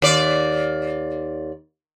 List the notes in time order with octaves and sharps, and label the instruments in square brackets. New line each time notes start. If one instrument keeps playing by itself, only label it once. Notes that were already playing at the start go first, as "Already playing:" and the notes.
[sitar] D#2 D5